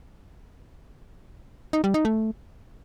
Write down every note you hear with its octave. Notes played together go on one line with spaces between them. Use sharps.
D#4
G3
D#4
A3